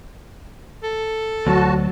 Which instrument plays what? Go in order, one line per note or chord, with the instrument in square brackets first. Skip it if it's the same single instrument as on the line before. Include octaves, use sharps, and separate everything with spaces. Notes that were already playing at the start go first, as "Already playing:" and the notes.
[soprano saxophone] A4
[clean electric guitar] D2 [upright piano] F#3 [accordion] F#4 A5